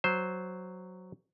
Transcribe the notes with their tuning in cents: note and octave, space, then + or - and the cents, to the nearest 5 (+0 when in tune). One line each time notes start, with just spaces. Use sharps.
F#3 +0 C5 +0